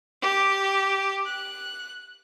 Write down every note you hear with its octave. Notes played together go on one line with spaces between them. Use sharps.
G4
F#6